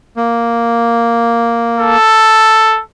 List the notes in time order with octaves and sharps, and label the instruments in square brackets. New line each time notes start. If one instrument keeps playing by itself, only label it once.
[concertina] A#3
[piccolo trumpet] A4